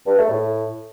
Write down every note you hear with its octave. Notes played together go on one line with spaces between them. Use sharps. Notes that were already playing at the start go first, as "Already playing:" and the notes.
G2
A3
A2